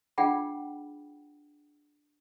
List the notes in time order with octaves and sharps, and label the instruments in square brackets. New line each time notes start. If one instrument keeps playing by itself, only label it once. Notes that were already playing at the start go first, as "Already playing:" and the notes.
[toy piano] D4 F4 G#4 F#5 G5 B5